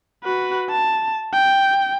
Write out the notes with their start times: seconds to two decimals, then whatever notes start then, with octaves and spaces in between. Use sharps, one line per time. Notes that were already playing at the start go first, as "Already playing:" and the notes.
0.24 F#4 B4
0.70 A5
1.33 G5